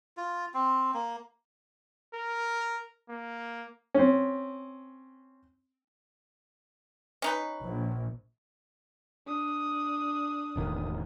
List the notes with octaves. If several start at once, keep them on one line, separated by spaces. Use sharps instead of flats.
F4
C4
A#3
A#4
A#3
C4 C#4
C#4 D#4 B4
A#1
D4 D#6
E1 A1 D#3